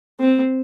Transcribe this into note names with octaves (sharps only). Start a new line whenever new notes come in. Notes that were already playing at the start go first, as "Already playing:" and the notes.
C4